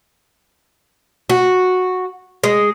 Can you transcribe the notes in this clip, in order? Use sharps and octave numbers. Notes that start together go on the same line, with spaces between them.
F#4
G#3